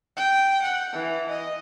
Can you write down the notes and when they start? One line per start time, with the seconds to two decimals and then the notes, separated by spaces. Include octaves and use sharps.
0.17 G5
0.62 F#5
0.93 E3
1.29 D#5